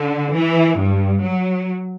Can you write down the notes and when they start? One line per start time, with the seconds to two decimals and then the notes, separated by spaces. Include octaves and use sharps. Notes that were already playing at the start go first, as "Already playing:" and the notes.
Already playing: D3
0.34 E3
0.79 G2
1.24 F#3